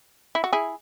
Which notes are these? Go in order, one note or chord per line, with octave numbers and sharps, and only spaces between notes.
E4
F#4
E4 G#4